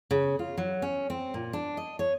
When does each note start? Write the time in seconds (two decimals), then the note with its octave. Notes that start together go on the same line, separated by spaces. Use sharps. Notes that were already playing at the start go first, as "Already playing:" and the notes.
0.11 C#3
0.39 F4
0.58 F#3
0.82 C#4
1.10 C4
1.34 A#2
1.53 D4
1.77 D#5
1.99 C#5